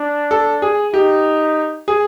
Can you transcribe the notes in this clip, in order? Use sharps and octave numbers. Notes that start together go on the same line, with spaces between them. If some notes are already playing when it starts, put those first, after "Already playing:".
Already playing: D4
A4
G#4
D#4 G4
G#4